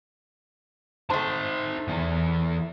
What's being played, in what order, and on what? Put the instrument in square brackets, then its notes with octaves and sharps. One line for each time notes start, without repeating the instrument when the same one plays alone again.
[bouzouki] A3 C5 [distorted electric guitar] D#4 A5
[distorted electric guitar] E3 B3